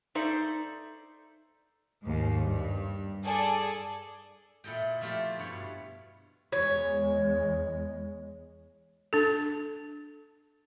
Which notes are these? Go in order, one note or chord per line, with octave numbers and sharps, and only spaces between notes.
D#4 A4 C5 D5 E5
D#2 G#2
G2
G#4 A4 D5 G#5
A#2 E4 A4 D#5 G5
F3 A3 E4 F4 G4 D5
G2 B2 C#5
E2 G#3 C#5
D4 A4